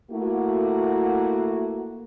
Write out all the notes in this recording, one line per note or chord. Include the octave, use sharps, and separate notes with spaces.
A3 A#3 E4 F#4